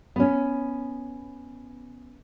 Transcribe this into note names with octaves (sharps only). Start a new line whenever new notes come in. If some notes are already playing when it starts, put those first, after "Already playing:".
B3 C#4